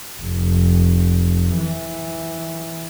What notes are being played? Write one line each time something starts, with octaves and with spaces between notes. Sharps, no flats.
F1
E3